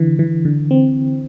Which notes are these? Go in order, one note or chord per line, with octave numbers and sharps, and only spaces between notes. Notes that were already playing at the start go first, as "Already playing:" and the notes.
Already playing: D3 E3
E3
D3
C4